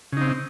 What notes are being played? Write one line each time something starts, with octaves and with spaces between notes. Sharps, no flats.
C#3 C4 D#4